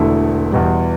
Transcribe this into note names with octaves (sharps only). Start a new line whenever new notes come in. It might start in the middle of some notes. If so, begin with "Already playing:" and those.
Already playing: E1 E2 D3 A3 E4
E2 B2 G3